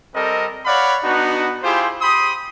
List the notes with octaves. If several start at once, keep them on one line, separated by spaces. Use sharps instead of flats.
G3 C4 A4 A#4 D#5
C#5 D5 F5 F#5 B5
B3 D4 D#4 F#4
E4 F4 G4 G#4 C5
G4 B5 C6 D#6